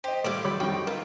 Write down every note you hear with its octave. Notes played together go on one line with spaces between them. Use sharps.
G4 C5 D#5
A2 G3 E4 F5 D6
C#3 F#3 G3 B5
F2 D#4 F#4 G4 G5 C#6
F4 A#4 E5